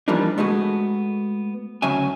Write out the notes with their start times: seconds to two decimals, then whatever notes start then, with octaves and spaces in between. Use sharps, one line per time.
0.08 E3 F3 G3 A#3 D4 D#4
0.38 G#3 A3 B3 F#4 G#4
1.82 D2 C#3 F#3 C#4 E5 G#5